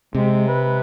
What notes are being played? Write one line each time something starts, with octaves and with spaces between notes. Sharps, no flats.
C3 G#3
B4